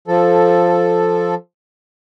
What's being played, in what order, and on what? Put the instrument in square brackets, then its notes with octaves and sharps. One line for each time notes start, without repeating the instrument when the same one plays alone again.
[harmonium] F3 A4